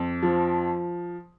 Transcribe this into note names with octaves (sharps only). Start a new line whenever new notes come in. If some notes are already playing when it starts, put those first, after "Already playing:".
Already playing: F2
F3